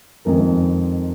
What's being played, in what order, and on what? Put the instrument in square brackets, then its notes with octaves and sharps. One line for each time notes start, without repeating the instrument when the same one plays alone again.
[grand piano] F2 D#3 G#3 F4 A#4